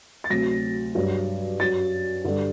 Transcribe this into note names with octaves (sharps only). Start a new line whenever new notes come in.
A6
D2 C3 F#3 A#6
G2 F#3
F#2 F#3 A6
G2 D3 G3